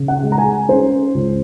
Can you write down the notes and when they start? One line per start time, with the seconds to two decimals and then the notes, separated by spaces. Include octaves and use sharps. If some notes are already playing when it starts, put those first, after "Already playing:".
Already playing: C#3
0.08 F#5
0.23 G#3
0.32 A#5
0.38 G#5
0.69 C#4 C5
1.14 C#2